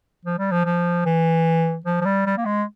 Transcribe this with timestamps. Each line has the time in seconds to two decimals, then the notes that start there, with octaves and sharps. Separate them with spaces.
0.25 F3
0.38 G3
0.51 F3
0.65 F3
1.06 E3
1.86 F3
2.01 F3
2.05 G3
2.26 G3
2.37 A#3
2.45 G#3